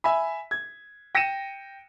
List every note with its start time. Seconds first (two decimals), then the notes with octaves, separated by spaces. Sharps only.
0.04 E5 G#5 B5
0.51 G#6
1.15 G5 A#6 C#7 D#7 E7